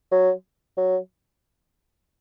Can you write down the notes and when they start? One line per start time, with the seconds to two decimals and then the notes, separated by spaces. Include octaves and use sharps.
0.11 F#3
0.77 F#3